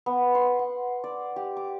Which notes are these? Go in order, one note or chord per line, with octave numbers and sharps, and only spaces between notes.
B3
C6
F#5
D5
G4
D6